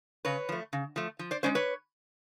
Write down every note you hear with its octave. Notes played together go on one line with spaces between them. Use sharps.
C#3 B4 C#5
F3 A3
C#3
F3 A3
F3
C5 D5
G#3 C#4 C5 D5
B4 C#5